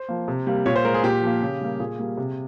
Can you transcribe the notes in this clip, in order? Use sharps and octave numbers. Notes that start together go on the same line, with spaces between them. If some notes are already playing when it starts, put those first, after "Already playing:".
Already playing: C5
F3 A#3
C3
G3 A#3
A#2 C#5
C5
G#3 A#4
G#4
A#2 G4
F3 A#3
C#3
G3 A#3
A#2 G#4
G3 A#3
C3